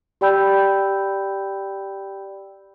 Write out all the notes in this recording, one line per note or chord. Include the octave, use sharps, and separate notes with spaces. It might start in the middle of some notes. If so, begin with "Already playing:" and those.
G4 D5 G5 B5 E6 G6